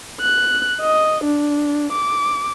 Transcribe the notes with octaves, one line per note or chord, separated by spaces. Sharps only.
F#6
D#5
D4
D6